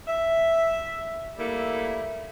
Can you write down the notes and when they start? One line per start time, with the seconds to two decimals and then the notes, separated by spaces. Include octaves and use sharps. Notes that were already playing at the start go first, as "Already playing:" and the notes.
0.07 E5
1.38 G3 A3 A#3 E4